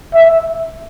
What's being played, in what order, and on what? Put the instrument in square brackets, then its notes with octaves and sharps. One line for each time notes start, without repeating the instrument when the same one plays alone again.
[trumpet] E5